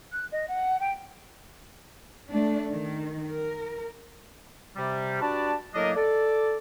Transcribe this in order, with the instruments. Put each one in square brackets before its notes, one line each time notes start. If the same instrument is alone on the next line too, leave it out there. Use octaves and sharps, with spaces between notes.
[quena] F#6
D#5
F#5
G5
[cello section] A3 D4
D#3
A#4
[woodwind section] C3 G3
G3 D4 F#4 B4 D5 A5
A2 F#3 A#3 D4 A#4 D#5
A4 D5